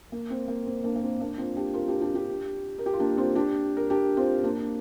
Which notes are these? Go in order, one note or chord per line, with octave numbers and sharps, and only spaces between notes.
A#3
C4
A#3
C4
A#3 D4
A#3
C4
A#3 D4
C4 F4
D4 G4
F4 A#4
D4 G4
D4 G4
D4 G4
A#4
G4
F4
A#3 D4
C4 F4
D4 G4
A#4
D4 G4
C4 F4
A#3 D4